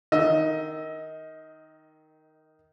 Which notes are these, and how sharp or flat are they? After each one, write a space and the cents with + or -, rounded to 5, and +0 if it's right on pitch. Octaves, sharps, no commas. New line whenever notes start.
D#3 +0 D#5 +25 E6 +0